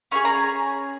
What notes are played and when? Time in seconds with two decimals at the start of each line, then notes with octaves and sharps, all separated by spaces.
0.11 C#4 F4 G#4 C#6
0.25 A#5